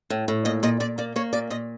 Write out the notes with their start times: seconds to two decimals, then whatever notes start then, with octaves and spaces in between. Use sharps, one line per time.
0.10 A2
0.28 A2
0.45 A#2 D#5
0.63 A#2 D#5
0.80 A#2 D5
0.98 A#3 D5
1.16 A#3 C#5
1.33 A#2 D5
1.50 A#2 D#5